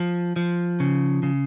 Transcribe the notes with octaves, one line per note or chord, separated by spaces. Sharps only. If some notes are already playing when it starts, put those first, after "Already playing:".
Already playing: F3
F3
C#3
C#3